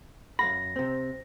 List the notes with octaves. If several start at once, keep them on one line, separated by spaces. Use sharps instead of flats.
F#2 F5 B5 A#6
C3 C4